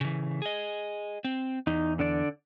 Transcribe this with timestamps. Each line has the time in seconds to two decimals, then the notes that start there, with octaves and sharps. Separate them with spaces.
0.01 C#3 E3
0.42 G#4 D#5
1.24 C4
1.67 E2 D#4
1.99 D3 D4 D5